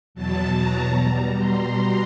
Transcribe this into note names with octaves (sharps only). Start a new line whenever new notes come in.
E2 B2 F#3 A5
A#5
B2 G3
C6